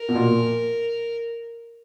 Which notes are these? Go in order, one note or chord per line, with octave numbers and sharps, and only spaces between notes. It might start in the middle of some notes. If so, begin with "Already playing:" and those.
Already playing: A#4
B2
A#2